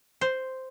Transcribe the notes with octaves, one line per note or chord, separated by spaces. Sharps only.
C5